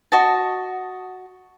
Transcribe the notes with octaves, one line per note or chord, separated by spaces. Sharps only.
F#4 D#5 A5